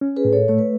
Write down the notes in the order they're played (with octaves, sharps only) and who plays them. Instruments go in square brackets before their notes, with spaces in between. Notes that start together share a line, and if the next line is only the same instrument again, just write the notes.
[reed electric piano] C#4
[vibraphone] G#4 B4
[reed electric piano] A2
[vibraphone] A4 C#5
[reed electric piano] A3 [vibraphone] C#5
[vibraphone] B4